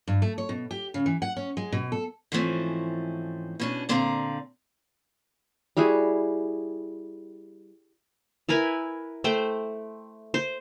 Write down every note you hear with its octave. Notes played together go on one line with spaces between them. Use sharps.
G2
A3
C#5
B2
G4
C#3
E3
F#5
C#4
G#3
B2
A4
G#2 E3 F3 A3 C4 C#4
B2 C#4 D4
A#2 D3 C4 D5 F5 A#5
G3 E4 F#4 G#4
E4 A#4 B4 G#5
A3 C5 G5
C5